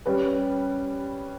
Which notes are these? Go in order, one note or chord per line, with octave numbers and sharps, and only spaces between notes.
G3 C#4 G4 B4